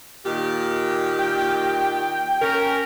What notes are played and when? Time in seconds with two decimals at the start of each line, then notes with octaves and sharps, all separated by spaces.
0.25 A#2 D#3 G4
1.19 G5
2.42 C#4 A#4